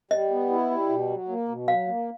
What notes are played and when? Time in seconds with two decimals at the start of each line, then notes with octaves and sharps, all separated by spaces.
0.11 G3 D#5
0.30 B3
0.50 E4
0.70 G3
0.89 B2
1.10 F#3
1.29 A#3
1.48 B2
1.68 F#3 F5
1.88 A#3